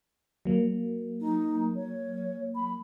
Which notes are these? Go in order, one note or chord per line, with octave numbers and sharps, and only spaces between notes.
F#3 A#3
D#4
C#5
B5